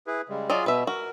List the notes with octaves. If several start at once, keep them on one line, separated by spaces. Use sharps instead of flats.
E4 G#4 B4
C#3 G3 G#3
F#3 F4 G#4 D5 D#5
B2 B4 E5
F#4 A#4